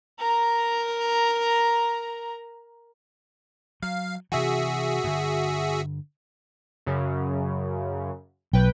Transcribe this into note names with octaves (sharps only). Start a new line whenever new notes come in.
A#4 A#5
F#3 F5
C3 E3 F#4 G#4 E5
G2 D3
F#2 C#3
B1 B4 G5